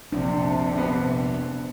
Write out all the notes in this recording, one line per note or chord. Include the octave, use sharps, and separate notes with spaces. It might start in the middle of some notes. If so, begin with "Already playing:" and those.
A#1 F2 C3 D4
D3 B3